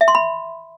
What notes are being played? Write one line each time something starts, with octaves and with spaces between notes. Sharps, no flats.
E5
C6
B5